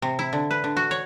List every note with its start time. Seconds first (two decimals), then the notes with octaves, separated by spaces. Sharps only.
0.02 C3
0.19 E4
0.33 D3
0.51 B4
0.64 D3
0.77 F#4
0.91 C#5